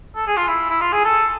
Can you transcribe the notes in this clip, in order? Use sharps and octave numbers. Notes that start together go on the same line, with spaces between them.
A4
G#4
F4
E4
E4
F4
G#4
A4